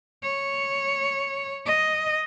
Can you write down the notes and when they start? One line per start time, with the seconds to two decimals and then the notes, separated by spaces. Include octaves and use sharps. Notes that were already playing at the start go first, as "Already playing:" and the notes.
0.23 C#5
1.66 D#5